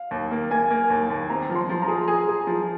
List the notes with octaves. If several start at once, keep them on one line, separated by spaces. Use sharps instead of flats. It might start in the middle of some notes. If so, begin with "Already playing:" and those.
Already playing: F5
D#2
A#3
A#3 G#5
A#3
D#2
D#2
C4 A#5
F3
C6
F3
A#5
G#4
G#4
G#4
F3